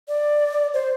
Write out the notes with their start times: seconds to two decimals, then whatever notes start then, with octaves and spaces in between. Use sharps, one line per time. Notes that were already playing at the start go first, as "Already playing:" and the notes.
0.08 D5
0.74 C5